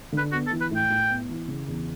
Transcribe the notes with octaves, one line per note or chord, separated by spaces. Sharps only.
D3 B4
B3 F#4
A4
E3
B4
A2 G5
A2
B3
E3
C#3
E2